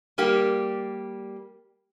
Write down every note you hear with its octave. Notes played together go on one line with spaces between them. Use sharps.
G3 A#3 G4